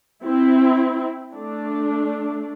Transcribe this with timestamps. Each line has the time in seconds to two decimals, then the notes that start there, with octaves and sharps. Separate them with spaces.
0.24 C4 E4
1.34 A3 D4